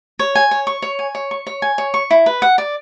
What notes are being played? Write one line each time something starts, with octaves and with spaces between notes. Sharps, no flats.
C#5
G#5
C#5
C#6
C#5
G#5
C#5
C#6
C#5
G#5
C#5
C#6
E4
B4
F#5
D5